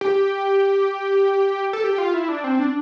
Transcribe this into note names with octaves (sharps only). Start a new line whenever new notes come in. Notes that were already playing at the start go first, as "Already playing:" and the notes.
G4
A4
G4
F4
E4
D4
C4
D4